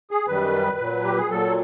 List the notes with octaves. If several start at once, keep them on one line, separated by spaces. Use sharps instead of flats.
G#4
F#2 D#3 G3 B4
A#2 F#3
G4
G#4
A#2 F#3 A4